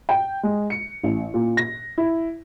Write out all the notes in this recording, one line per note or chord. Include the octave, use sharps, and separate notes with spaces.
G5
G#3
C#7
A1
A#2
A#6
E4